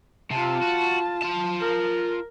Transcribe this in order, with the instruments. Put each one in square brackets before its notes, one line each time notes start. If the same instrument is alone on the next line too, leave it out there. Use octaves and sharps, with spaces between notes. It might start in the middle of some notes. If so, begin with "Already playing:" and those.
[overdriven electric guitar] C3 [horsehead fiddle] F4 A5
[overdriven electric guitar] F#4
F4 A5
[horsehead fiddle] A#4